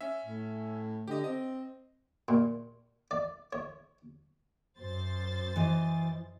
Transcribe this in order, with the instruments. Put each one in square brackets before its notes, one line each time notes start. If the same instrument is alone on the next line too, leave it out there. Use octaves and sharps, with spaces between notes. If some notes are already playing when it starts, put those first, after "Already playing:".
[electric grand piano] C#4 E5
[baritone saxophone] A2
[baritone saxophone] D3 [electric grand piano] G4 D#5
[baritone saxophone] C4 [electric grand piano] D#5
[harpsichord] A#2
D5
C#5
[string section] F#2 C5 A6
[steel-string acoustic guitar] E3 D#5